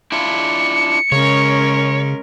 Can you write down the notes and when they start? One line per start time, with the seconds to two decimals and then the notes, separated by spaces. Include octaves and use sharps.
0.12 D4 E4 F4 C#7
1.12 C#3 G#3 C#4 A#4 C#5